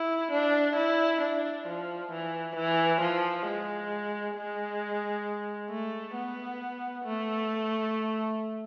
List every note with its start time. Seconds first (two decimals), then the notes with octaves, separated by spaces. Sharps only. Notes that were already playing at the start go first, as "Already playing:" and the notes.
Already playing: E4
0.31 D4
0.75 E4
1.21 D4
1.66 F3
2.11 E3
2.56 E3
3.01 F3
3.46 G#3
4.35 G#3
5.69 A3
6.15 B3
7.05 A3